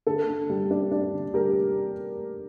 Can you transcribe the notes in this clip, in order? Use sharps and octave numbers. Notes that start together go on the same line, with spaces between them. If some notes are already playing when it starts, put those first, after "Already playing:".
D3 A4
D3
G3
D4
D4
D3
G3 G4 A#4